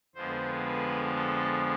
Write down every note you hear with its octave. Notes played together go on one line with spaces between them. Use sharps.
F2 D3 F3 G#3 B3 C5
B4
A4